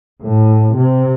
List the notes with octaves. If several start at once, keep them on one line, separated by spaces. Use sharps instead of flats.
A2
C3